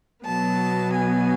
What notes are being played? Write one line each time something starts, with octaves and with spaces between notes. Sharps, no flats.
B2 F#3 B3 A5
G#5